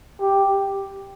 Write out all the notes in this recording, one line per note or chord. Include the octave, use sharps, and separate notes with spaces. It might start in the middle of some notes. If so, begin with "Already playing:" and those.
G4